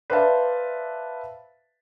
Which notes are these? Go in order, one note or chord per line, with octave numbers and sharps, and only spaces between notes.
B4 C5 D5 E5 F5 A5